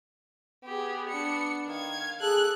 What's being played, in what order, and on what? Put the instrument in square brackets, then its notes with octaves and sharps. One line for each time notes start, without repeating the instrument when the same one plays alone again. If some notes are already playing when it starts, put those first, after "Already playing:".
[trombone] B3 [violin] G4 G#4
[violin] D4 C#7
[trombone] D#3 [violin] F5 G#6
[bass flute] G#4 [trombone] A4 [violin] F#6